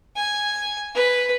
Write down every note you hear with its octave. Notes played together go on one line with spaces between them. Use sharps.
G#5
B4